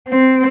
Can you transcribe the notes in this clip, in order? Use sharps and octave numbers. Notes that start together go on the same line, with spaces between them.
C4